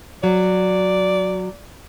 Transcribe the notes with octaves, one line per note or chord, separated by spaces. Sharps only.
F#3 D5